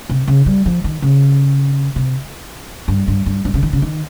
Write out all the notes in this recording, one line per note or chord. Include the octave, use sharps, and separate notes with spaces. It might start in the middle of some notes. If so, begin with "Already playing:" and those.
C3
C#3
G3
F3
D#3
C#3
C3
G2
G2
G2
G2
C#3
D#3
C#3
D#3